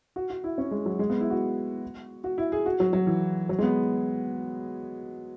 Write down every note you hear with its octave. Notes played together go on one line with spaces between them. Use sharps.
F#4
F#4
E4
C#4
G#3
F#3
G#3
B3
E4
F#4
F#4
E4
G#4
F#4
F#3
F#3
E3
F#3
G#3
B3